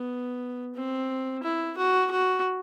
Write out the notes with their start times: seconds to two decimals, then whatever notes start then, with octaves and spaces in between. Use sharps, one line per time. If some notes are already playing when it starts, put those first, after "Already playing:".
Already playing: B3
0.75 C4
1.43 E4
1.78 F#4
2.11 F#4